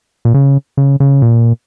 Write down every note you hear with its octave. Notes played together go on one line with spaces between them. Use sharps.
A#2
C#3
C#3
C#3
A#2